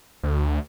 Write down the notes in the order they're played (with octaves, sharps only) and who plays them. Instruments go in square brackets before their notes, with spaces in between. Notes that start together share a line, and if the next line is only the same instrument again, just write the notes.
[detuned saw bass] D2